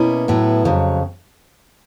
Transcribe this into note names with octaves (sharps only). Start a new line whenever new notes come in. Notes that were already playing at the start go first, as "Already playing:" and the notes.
Already playing: B2 A#3 C#4 E4
A2 F#3 B3 E4
F2 C#3 F#3